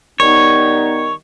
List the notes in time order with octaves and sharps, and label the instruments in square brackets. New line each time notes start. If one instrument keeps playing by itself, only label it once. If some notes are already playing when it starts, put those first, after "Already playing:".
[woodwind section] D#3 G3 B3 D#4 [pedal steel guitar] C#5